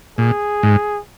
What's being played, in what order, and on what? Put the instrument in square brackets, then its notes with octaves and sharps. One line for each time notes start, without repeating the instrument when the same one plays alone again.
[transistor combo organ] A#2 [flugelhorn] G#4
[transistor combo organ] G#2